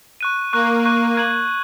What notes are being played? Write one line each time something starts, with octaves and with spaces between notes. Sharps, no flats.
C#6 F#6 D#7
A#3 C#6 F#6 D#7
C#6 F#6 D#7
G#6 F#7